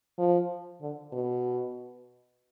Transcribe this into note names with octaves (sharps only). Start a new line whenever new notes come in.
F3
D3
B2